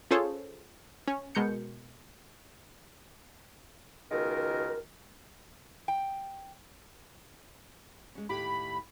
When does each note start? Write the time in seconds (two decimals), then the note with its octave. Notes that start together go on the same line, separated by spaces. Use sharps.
0.11 C#4 F4 G#4 A4 C5 C#5
1.08 C#4
1.35 B2 G#3 A#4 G6 C#7
4.11 C#2 B2 D#3 A#4
5.88 G5
8.15 G#3 C#4
8.29 D#2 A2 G4 B5